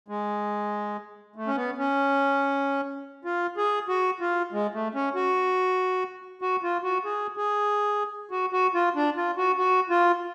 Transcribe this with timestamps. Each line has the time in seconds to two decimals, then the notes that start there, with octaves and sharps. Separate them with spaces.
0.08 G#3
1.36 A3
1.47 C#4
1.56 B3
1.78 C#4
3.25 F4
3.57 G#4
3.88 F#4
4.20 F4
4.52 G#3
4.73 A3
4.95 C#4
5.15 F#4
6.42 F#4
6.63 F4
6.83 F#4
7.05 G#4
7.37 G#4
8.31 F#4
8.52 F#4
8.74 F4
8.95 D4
9.17 F4
9.37 F#4
9.58 F#4
9.90 F4